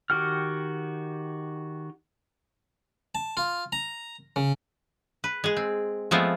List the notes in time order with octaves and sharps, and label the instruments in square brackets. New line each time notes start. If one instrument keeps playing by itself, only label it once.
[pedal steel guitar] D#3 F#4 G4 F#5 F6
[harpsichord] A5
F4
A#5
C#3
[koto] B4
G#3 G#4
C4
F3 G#3 A3 B3 C4 F4